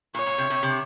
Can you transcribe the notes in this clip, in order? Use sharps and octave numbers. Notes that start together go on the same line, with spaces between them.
A#2 C#5
A#2
C3
C3
C3